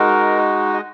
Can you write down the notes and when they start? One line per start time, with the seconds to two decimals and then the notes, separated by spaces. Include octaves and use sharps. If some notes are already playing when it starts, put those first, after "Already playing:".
Already playing: G#3 D#4 F#4 A#4
0.74 D#5